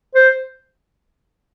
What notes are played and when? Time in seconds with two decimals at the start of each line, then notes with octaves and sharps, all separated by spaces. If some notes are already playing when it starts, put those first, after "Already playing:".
0.15 C5